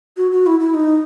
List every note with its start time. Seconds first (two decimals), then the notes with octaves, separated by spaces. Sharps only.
0.17 F#4
0.31 F#4
0.47 E4
0.60 E4
0.74 D#4